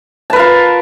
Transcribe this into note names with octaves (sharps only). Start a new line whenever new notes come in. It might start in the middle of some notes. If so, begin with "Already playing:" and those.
F4 A#4 B4 A5